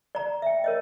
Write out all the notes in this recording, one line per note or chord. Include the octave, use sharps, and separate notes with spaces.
D5 A#5
E5 G5
A#4 C#5 D#5